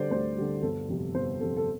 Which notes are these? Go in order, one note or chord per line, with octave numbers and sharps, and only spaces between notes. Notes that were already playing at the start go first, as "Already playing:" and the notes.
Already playing: D3 G3 C5 D5
D2 C5
D3 G3
G1 A4
F2 C3 G3
G1 C5
F2 C3 G3 A4
A4